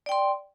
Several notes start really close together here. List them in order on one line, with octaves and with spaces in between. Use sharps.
D5 G5 C6